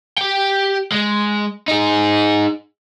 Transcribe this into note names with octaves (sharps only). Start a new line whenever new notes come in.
G4 G5
G#3
D#4 G#4